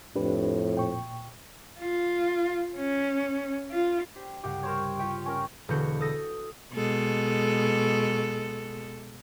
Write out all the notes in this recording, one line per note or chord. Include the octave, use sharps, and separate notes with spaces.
F2 A2 D4 G4 B4
A#2 G5 C#6
F4
C#4
F4
D4 G4 C5
C2 G2 C#3 G4 F#5
A#4 C5 C#5
F4 G4 C#5 G5
C#4 A#4
E1 D3 F#4 G6 C#7
A4 D#6 A#6
B2 G#3 A4